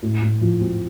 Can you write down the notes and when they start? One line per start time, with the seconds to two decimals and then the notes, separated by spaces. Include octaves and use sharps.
0.02 A2
0.22 A2
0.41 F3
0.61 C4